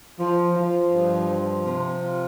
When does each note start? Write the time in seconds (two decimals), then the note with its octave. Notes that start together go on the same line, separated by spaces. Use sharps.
0.19 F3
0.55 F3
0.92 G2
1.29 F3
1.65 C3
2.01 F4